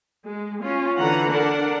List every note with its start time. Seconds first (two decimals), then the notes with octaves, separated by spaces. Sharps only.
0.24 G#3
0.61 C#4 F4
0.99 D3 E3 F#5 A#5
1.31 D4 A#4 F#5